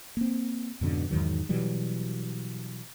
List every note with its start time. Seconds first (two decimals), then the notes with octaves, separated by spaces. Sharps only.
0.17 A#3 C4
0.81 F2 G#2 B2 D3
1.10 E2 G#2 D#3 F#3
1.49 B2 E3 F#3 G3